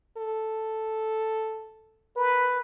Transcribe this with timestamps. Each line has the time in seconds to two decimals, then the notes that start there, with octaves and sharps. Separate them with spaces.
0.18 A4
2.17 A#4 B4